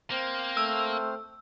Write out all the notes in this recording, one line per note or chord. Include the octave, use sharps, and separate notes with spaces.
A#3 C4 C5 F6
A3 E6